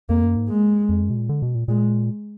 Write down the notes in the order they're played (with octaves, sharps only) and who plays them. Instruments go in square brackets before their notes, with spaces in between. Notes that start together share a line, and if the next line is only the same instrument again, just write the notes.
[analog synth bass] F2 [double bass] A#3
[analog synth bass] F#2
G#2
[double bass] G#3
[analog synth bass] F2
F#2
B2
A#2
D3
B2
A#2
[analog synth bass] A#2 [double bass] G#3